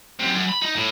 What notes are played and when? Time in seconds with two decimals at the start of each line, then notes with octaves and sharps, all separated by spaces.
0.19 F#2 C3
0.33 F#2
0.49 B5
0.62 D#4
0.76 A2